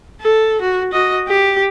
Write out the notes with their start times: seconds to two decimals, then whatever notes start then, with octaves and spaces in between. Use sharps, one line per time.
0.21 A4
0.61 F#4
0.92 F#4 D#5
1.28 G4